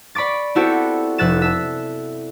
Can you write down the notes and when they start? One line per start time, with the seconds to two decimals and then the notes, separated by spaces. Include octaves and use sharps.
0.15 D5 B5 C#6 D6 A6
0.55 B3 C4 E4 F#4 G4 A4
1.18 F1 E5 F#6 A6 E7
1.42 A4 E5